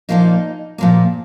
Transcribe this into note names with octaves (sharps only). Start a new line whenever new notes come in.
A#2 F3 A#3 D#4
A#2 F3 A#3